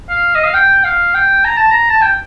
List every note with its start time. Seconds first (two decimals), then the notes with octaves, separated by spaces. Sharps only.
0.10 F5
0.35 D#5
0.45 F5
0.54 G5
0.84 F5
1.15 G5
1.45 A#5
1.57 A5
1.70 A#5
1.90 A5
2.02 G5